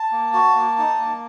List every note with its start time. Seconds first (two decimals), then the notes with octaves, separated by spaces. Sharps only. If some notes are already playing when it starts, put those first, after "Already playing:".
Already playing: A5
0.12 A#3
0.34 F#4
0.56 A#3
0.78 D#4
1.00 A#3